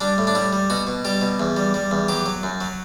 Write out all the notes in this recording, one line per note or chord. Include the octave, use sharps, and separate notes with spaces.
G3 D4
A2
D4
G3 E4
G3
B2 F#4
B2
G3 G4
B2
E2
G3
G3
E2
F#3 G4
F#3
F#2
F#3